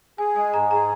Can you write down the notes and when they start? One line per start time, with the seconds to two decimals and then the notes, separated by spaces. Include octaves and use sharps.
0.18 G#4 G#5
0.36 G#3 G#5
0.54 G#2 A#5
0.71 G#4 A#5